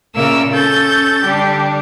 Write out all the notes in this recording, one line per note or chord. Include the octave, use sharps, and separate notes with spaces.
A#2 C#3 A#3 A#4 E5 E6
C#4 A4 G6 A6
D3 G3 D4 G4